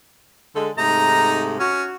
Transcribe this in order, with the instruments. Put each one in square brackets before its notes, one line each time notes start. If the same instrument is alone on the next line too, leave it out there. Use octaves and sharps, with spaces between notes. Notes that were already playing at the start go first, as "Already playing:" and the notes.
[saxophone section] D3 G#3 A4
[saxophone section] G#2 C3 A3 [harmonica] D#4 A#5
[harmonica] C#4 [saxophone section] F#4